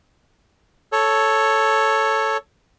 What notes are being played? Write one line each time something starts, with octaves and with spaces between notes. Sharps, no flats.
A4 C#5